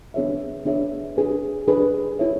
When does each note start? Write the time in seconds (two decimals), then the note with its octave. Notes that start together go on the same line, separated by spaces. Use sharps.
0.14 B3 D4 G#4 C#5 E5
0.65 B3 D4 G#4 C#5 E5
1.17 D4 G#4 B4
1.68 D4 G#4 B4
2.19 E4 A4 C#5 E5